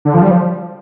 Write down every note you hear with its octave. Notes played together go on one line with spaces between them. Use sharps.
D3
F3
G3
F3